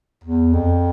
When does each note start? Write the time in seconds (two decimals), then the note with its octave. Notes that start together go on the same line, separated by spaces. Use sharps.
0.24 E2
0.53 F2